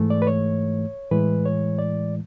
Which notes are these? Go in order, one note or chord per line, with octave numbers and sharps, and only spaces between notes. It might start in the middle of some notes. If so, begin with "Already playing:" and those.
Already playing: G#2 E3 A3
D5
B4
C#5
A2 E3 G#3 B4
C#5
D5